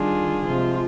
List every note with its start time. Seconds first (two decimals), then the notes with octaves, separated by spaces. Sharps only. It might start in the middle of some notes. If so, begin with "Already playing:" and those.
Already playing: D#3 G3 D4 F4 G#4
0.46 C3 F3 G#3 F4